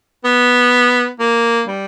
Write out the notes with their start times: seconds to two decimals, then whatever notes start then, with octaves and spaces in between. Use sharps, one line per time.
0.24 B3
1.20 A#3
1.67 G3